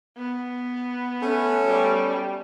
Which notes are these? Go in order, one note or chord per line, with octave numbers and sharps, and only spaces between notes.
B3
A3 C#4
G3